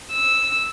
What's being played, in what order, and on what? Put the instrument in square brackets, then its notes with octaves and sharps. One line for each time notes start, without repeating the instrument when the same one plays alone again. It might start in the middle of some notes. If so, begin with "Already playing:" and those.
[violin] E6